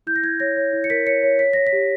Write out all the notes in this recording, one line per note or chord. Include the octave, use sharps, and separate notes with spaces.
E4 G6
A#6
E4 G#6
C#5 A#6
C#5
E4
C#7
A#4 B6
C#5 C#7
C#5
C#5 B6
C#5 A#6
B6
G4